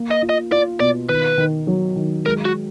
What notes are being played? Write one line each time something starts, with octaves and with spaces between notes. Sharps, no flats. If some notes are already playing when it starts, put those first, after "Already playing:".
Already playing: A#3
D#5
F4
D#5
F4 D5
B2 D5
D#3 B4
D#3
F#3
D#3
G#3 A#4
F#4